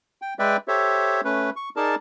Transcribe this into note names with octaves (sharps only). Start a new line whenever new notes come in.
G5
G#3 B4 D5 E5 G5
G4 A4 C5 C#5 E5
A3 C#4 B4
C#6
D#4 G#4 A#4 D5 A5